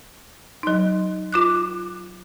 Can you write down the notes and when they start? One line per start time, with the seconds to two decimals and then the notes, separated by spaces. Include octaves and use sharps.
0.63 F#3 D#4
1.32 F4 D6 F#6